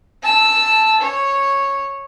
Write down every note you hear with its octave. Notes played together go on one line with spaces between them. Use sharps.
A5 E6
C#5